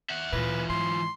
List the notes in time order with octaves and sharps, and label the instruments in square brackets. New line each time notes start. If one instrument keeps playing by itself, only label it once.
[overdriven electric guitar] E5 F#5
[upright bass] D2 A#2 [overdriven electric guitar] E3 F4 [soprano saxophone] B4
[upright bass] G#2 [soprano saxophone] C6